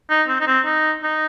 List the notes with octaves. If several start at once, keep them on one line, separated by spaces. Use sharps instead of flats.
D#4
C4
D#4
C4
D#4
D#4